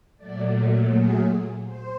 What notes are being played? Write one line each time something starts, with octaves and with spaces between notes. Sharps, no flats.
A#2 F#3 A3 D5
G#4
C5